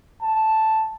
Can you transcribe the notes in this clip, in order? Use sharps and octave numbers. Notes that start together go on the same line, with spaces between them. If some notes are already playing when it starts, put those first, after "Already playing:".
A5